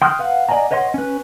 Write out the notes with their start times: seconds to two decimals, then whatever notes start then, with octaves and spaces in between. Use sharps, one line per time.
0.02 G5 C6 D#6 F6 F#6
0.19 B4 F5 F#5
0.49 D5 D#5 F#5 G#5 A#5
0.71 B4 C#5 D#5 F#5 C6
0.94 C#4 B4